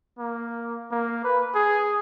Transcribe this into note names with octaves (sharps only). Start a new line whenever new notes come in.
A#3
A#3
B4
G#4